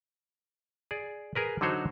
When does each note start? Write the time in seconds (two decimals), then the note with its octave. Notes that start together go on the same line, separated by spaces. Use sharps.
0.91 G#4 D5
1.35 G#4 A#4 B4
1.61 D3 F#3 D#4 F#4 C5 C#5